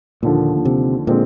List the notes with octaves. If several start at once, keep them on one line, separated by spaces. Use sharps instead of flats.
D#2 A#2 D3 F3
C3
A#2 D3 G#3 C4